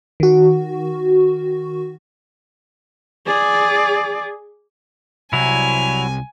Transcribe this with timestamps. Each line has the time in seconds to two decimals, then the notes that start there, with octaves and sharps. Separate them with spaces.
0.20 D#3 F#4
3.27 G#4 D5
5.33 C2 F#3 E4 G#5 F7